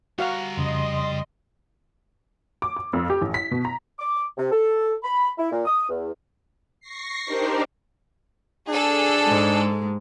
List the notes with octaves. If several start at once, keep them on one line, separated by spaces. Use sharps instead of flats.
G3 F#4 F5 F#5 A#5
F2 C#3 D#5 C6
D6
D6
F2
G4
A1
B6
B2
A#5
D6
C3
A4
B5
E4
A#2
D#6
E2
C#6 A#6 C7
D4 D#4 G4 A#4 C5 D5
D4 G#4 A4
G#2 G#3